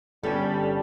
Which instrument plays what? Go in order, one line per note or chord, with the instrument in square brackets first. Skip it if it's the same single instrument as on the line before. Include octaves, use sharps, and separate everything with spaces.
[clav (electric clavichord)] G1 C#4 [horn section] G3 [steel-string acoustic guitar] A4